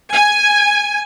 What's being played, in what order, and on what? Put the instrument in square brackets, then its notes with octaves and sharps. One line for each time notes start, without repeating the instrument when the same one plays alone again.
[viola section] G#5